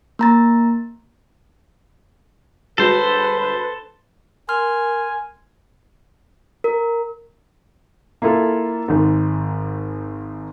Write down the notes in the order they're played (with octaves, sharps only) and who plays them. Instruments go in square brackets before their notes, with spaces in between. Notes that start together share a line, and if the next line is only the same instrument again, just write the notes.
[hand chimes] A#3 A#5 A6
[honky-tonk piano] G1 G#3 F#4 [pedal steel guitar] A4 C5 [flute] B4
[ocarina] A#4 [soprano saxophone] G#5 [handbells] C6 F6
[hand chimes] A#4
[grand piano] A#3 E4 F4 A4
G#1 G#2